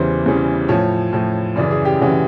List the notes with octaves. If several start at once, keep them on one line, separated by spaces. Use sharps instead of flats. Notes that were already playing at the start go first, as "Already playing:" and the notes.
Already playing: E2 C#3 E3 G3 C5
E2 C#3 E3 G3
A2 F3 C#5
A2 F3
F#2 C#3 E3 D5
G#4
G4
F#2 C#3 E3 F#4